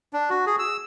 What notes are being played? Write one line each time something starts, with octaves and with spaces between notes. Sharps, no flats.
D4
F#4
G#4
E6